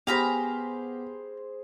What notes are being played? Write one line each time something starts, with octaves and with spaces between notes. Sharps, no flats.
B3 G4 G#4 C5 F5 A#5 B5